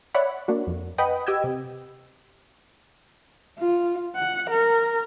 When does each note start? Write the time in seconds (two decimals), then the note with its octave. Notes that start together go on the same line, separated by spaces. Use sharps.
0.14 C#5 D5 E5 F#5 B5
0.48 A#3 D4 F#4
0.67 F2
0.98 B4 D#5 F#5 G5 B5 D#6
1.26 G4 D#5 G5 E6 G#6
1.44 C3
3.59 F4
4.16 F#5
4.50 A#4